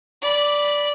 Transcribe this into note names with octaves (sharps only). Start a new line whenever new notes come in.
D5 B5